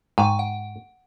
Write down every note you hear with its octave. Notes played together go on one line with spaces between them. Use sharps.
G#2 G5 C#6
F#5